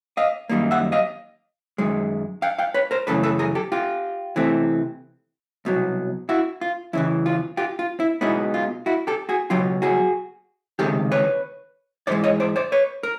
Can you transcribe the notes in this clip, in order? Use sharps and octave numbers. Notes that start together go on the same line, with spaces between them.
D#5 F5
F#2 D#3 G3 A#3
E5 F#5
D#5 F5
F#2 D#3 G#3
F5 G5
F5 G5
B4 C#5
A#4 C5
F#2 C#3 E3 A3 A4 B4
A4 B4
G#4 A#4
G4 A4
F4 G4
C3 E3 A3 C4
C2 B2 F#3
E4 F#4
F4
E2 C#3 E3 E4
F4
F4 G4
F4
E4
B2 G#3 B3 D#4 E4
F4
E4 F#4
G4 A4
F#4 G#4
C#2 B2 F#3 F4 G4
F#4 G#4
C#2 C3 D#3 G#3 G4 A4
B4 C#5
G#2 E3 G#3 C5 D5
C#5 D#5
C5 D5
C5 D5
B4 C#5
A#4